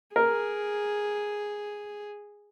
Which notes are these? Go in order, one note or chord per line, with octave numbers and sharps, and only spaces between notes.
G#4 A#4